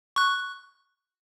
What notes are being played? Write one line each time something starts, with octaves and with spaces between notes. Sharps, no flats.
C#6 F#6